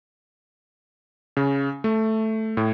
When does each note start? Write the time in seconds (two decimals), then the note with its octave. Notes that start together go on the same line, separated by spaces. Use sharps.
1.37 C#3
1.84 A3
2.57 A2